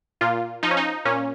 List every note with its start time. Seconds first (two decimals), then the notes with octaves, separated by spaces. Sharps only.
0.21 A#2 F4
0.63 F3 D#4
0.71 C#4
0.77 D#4
1.05 A#2 C#4